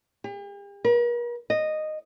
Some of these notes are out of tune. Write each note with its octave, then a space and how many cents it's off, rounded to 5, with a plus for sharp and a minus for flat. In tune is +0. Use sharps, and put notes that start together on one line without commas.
G4 +45
A#4 +45
D#5 -10